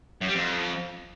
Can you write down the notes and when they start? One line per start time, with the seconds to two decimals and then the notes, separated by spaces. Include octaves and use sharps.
0.21 F#2
0.28 G3
0.35 F2